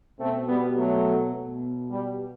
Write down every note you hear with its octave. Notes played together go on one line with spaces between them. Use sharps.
B2 A3 C4
G3 B3
F#3 A3
B2
G3